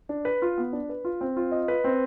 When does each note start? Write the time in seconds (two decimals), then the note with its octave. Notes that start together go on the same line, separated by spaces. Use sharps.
0.09 D4
0.25 B4
0.42 F4
0.58 B3
0.73 D4
0.89 B4
1.05 F4
1.21 C4
1.37 F4
1.52 D#5
1.68 B4
1.84 C4